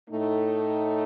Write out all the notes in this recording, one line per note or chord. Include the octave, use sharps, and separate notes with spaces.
A2 A3 D#4